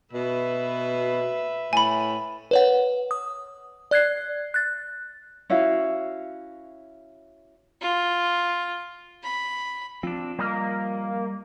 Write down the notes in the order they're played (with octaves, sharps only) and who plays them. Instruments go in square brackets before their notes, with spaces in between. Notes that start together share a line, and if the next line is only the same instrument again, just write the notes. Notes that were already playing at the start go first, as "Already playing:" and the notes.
[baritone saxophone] B2 [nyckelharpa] B4 E5
[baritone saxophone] A2 [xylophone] G#5 B5
[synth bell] B4 C#5 F#5
D#6
D5 F#6 G#6 C7
F#6 A6
[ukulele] C#4 E4 F#4 F5
[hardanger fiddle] F4
B5
[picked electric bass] F3 [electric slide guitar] C4 D4
[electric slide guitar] G3 D#5 [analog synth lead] A#3